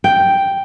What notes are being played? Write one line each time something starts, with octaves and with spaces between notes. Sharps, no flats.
G5